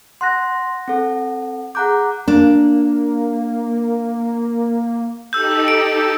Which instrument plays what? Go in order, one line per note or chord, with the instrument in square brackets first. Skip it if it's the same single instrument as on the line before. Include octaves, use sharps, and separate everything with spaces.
[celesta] F#5 F#6 A#6 [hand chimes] C6
[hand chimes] C4 A4 [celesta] F#5
[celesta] G#4 F#6 G6 [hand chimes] F#5 A#5 D6
[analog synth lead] A#3 [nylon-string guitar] D4
[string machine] D#4 G4 A4 [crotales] E6 G6
[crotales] D7